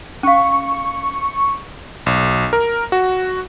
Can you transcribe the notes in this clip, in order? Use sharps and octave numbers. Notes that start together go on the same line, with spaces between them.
C#4 F5 C#6
B1
A#4
F#4